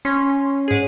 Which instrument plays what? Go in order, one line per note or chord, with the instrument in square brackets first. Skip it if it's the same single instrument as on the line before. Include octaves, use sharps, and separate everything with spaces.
[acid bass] C#4 [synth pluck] C6
[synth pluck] G#2 G#4